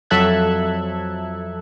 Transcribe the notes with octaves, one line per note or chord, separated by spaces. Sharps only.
F2 F#3 A4 E5 F#6 G#6